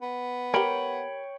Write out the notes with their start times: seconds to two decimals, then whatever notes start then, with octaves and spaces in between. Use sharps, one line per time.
0.02 B3
0.54 G4 A#4 C#5 G5 B5